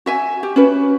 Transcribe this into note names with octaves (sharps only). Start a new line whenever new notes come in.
F#4 E5 G#5
G4
C#4 F#4 B4